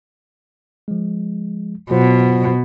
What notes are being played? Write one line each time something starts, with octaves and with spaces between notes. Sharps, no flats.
F3 G#3
B2 F#3 F4 C5